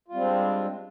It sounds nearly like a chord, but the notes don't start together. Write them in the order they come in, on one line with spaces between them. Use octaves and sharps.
F4 G3 C4 G#3 D4